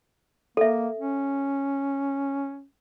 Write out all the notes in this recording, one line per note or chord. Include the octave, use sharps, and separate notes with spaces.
A#3 A4 E5
C#4